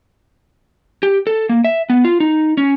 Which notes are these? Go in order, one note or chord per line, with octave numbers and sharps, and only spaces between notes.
G4
A4
A#3
E5
B3
F4
D#4
C#4